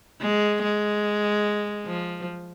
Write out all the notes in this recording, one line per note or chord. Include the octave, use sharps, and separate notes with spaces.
G#3
G#3
F3